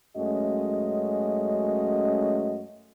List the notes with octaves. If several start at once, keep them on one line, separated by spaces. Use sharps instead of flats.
F#2 G#3 A3 C#4 F#4 D#5